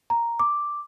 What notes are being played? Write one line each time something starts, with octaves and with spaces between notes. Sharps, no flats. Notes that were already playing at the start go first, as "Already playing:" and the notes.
A#5
D6